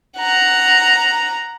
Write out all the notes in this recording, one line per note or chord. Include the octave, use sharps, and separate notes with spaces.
F#5 A#5